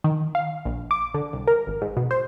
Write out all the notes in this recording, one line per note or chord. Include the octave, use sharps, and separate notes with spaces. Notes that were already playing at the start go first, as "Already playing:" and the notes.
D#3
F5
A#1
D6
D3
C2
A#4
G#1
G#2
B2
C5